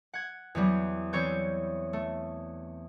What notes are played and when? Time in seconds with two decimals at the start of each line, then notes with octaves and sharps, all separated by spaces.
0.14 F#5 G#6
0.55 E2 F#3 G3
1.13 E3 C4 C#5 D5 C#6 G6
1.93 A3